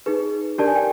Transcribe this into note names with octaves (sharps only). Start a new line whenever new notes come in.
D#4 G#4 B4
D4 G4 A#4 D5 A5
G#5
G5